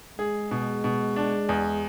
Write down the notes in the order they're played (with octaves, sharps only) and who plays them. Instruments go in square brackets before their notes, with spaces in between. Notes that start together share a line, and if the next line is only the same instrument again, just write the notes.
[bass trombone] G#3 [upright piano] G#4
[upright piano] B2
B2
D4
E2